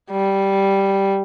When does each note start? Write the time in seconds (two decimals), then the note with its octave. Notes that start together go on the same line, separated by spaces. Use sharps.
0.11 G3